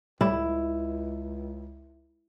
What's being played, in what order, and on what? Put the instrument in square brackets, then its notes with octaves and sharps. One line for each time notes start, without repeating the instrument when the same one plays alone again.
[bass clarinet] C#2 [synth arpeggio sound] A2 G3 [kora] E4